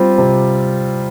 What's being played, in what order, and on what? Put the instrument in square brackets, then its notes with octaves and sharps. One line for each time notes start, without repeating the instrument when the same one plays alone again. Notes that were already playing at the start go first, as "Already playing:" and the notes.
Already playing: [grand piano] G3 C4 F4
C3